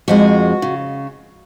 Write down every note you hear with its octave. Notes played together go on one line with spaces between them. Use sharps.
F2 F3 G#3 F#4
C#3